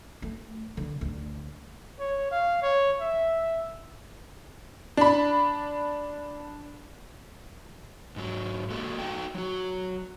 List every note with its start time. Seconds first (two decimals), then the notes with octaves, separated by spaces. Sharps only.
0.22 A3
0.77 D3
1.01 D2
1.99 C#5
2.31 F5
2.62 C#5
3.00 E5
4.97 D4 B5
8.16 G#2 F#3
8.70 G#3 A#3 F#4 G4 A4
8.99 D#4 F#4 A4 G5
9.35 F#3 F#4